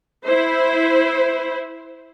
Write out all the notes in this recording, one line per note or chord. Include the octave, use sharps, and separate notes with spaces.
E4 C5